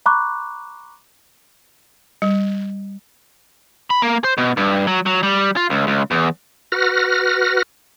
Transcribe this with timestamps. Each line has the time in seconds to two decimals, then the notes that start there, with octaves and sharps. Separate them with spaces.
0.06 A#5 B5 C#6 D6 F#6
2.22 G3
3.90 B5
4.02 A#3
4.24 C5
4.38 B2
4.57 G2
4.87 F#3
5.06 F#3
5.23 G3
5.56 F4
5.70 C#2
5.87 C#2
6.11 E2
6.72 F#4 B4 F6 A#6